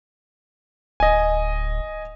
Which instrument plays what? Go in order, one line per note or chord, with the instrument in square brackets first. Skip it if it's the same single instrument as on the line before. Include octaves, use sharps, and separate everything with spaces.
[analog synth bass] D1 [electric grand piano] D#5 G#5